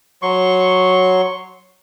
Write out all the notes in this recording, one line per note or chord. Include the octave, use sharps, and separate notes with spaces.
F#3 C6 C#6